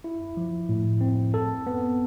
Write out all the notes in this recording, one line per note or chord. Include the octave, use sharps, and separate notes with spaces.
E4
F3
A2
C4
A4
B3